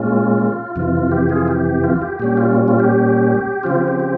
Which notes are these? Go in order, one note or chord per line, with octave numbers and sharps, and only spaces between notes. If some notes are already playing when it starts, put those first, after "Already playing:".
Already playing: A#2 G#3 C#4 F4
F2 C3 E3 F4
G4
F4 G#4
G4
F4
G4
A#2 G3 C#4 G4
F4
F4
G4
C#3 F3 C4 F4
G4
G4
G4